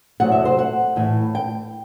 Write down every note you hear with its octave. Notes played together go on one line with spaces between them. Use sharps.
E2 C3 F#3 A3 F#5
E5
C5
F#5
A2 E3 A3
G5